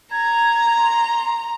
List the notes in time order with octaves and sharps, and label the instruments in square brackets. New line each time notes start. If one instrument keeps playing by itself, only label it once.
[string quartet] A#5 [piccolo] G#6
[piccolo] C6